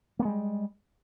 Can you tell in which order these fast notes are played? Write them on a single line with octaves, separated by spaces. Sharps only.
A#3 B3 G#3 G3